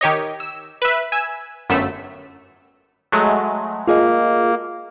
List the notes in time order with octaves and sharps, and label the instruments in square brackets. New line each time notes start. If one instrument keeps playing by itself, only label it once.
[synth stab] D#3 G4 C#5 D#5
E6
B4 E5
G#5 E6
G1 F#2 A3 E6 B6
F#3 G#3 A3
[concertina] A#3 [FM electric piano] F4 G#4 D#5